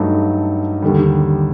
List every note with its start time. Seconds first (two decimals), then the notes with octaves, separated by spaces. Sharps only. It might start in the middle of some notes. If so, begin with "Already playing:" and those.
Already playing: G2 F#3 A3 D#4 A4
0.82 D#2 D3 G3